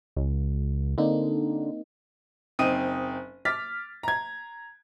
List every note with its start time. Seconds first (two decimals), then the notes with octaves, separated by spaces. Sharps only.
0.17 C#2
0.98 D3 A#3 C4 D#4
2.59 F#1 C4 D#4 D#6 D#7
3.45 D6 F6 A6 B6
4.03 A#5 G#6